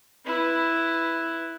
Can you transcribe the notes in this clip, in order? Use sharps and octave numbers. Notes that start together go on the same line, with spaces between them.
E4 B4